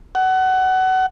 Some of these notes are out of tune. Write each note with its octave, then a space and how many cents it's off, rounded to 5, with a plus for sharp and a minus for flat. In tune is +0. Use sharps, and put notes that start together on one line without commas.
F#5 +20